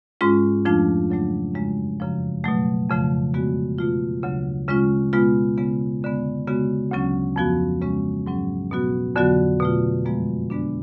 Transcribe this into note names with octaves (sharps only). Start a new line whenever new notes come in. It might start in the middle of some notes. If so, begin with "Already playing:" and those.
G#2 G#3 C#4 F4
F2 F3 A3 D4 F4
C#3 F#3 A3 D4
F#2 C#3 G#3
F#2 C#3 F3
B2 F#3 A3
F2 C#3 F3 A3
D3 G#3 B3 F#4
B2 A3 F4
D2 C#3 F#3
C#3 G#3 C#4 F4
B2 G#3 B3 F4
C#3 G#3 B3
F2 D3 G#3 B3
C#3 G#3 B3 F#4
D2 C#3 F#3 C#4
F2 F3 B3 F#4
C#3 G#3 C#4
G#2 F#3 C#4
B2 F#3 B3 F#4
F2 D3 F#3 B3 F#4
B2 A3 F4
F#2 F3 G#3 B3
D3 G#3 B3 D4